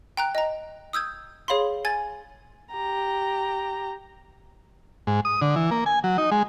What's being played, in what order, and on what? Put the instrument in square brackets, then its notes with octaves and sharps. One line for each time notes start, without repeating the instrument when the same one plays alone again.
[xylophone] G5 A#5 F#6
D#5 A#5
D#6 E6 G6 G#6
G#4 C#5 F5 B5 C6
G#5 G#6 A6
[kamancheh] G4 A#5
[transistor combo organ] G#2
D#6
D3
E3
A#3
G#5
F#3
D#4
G#3